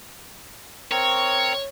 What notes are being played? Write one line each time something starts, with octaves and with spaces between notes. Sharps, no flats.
C4 A#4 C#5